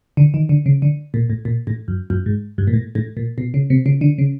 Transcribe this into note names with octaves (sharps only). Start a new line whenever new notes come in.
D3
D#3
D3
C#3
D3
A#2
A2
A#2
A2
F#2
F#2
G#2
G2
A#2
A2
A2
A#2
B2
C#3
C3
C#3
D3
C#3